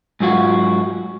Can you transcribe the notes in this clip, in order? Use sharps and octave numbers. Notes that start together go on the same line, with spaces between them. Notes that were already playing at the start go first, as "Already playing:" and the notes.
G#2 F#3 F4 F#4